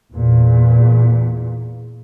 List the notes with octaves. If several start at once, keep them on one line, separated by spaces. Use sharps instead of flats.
E2 A#2